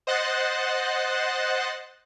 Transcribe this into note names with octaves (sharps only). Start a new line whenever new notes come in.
C5 D#5 F#5 F#6 A6 C7